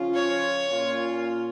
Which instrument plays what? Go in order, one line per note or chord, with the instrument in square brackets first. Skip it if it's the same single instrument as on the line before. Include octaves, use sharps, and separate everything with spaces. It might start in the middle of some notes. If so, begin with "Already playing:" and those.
Already playing: [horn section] C#3 F3 C#4 F4
[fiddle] C#5
[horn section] A#2 A#3 C#4 F4